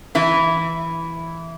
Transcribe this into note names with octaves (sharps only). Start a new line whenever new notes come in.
E3 E4